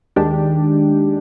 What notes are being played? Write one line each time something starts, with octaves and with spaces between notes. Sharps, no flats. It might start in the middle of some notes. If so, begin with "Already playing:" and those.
D#2 D#3 G#3 D4 G4